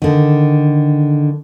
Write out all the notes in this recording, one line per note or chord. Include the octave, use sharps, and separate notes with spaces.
D3 D#3